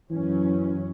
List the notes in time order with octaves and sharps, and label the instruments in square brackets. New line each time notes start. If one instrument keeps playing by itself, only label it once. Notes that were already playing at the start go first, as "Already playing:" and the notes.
[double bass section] F#2 F#3 C#4 [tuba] E3